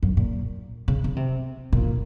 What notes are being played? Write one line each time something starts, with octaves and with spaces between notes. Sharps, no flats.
F#2
A#2
C#3
C#3
C3
A#2